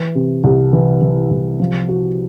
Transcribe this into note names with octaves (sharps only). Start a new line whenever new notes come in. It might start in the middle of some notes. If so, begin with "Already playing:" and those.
Already playing: E3
C3
C2
E3
E3
C2
F3
F#4